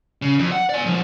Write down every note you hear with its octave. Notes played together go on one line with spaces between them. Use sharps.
C#3
F2
F#5
D5 G#5
D3 F3